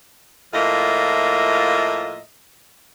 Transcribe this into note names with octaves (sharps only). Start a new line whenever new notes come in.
A2 F3 A#3 F4 D#5 E5